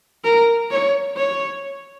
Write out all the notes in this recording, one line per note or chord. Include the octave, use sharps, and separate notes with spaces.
A#4
C#5
C#5